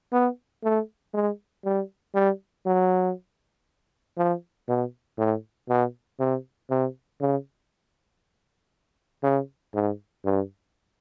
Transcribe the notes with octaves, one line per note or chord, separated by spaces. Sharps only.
B3
A3
G#3
G3
G3
F#3
F3
B2
A2
B2
C3
C3
C#3
C#3
G#2
G2